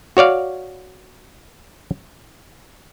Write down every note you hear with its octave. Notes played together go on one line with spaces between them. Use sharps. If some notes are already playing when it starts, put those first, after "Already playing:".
F#4 C#5 D5 F5